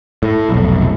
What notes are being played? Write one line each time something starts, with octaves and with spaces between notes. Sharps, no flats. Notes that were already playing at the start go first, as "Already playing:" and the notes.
A2
F1 B1